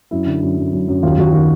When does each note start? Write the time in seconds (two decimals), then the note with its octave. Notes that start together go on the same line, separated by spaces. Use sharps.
0.11 F#2 E4
0.27 D3
0.43 F#2
0.58 F#2
0.73 F#2
0.88 F#2
1.03 D#2 F4
1.18 D#2 F#4
1.33 D#3 F#4